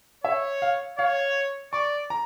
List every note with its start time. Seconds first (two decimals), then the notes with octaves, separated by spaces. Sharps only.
0.24 C#5 E5
0.62 F5
0.98 C#5 F5
1.73 D5 C#6
2.10 A#5